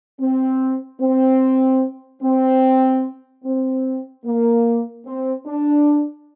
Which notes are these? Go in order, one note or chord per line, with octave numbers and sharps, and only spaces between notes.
C4
C4
C4
C4
A#3
C4
D4